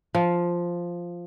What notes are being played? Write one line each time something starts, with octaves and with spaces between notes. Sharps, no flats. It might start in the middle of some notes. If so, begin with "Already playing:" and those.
F3